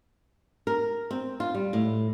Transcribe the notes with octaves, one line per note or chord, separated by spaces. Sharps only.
A#4
C4
F4
G3
A2